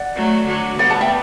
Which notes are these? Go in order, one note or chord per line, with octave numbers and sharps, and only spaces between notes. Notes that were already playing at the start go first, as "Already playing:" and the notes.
Already playing: D5 F#5
F#3 A3
D3 F#3
G3 B3 D5 F#5
F#5 A5
E5 G5